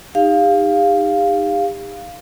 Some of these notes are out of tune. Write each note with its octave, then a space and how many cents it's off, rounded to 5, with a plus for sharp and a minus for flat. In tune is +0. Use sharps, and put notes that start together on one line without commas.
D#4 +0 G4 +40 F5 +0